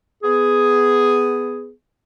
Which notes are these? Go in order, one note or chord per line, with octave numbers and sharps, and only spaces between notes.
B3 G#4